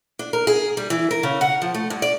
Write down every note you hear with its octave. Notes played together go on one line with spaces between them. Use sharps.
D4
A#4
G#4
G3
E3
A#4
C#3
F#5
F3
A3
G2
D5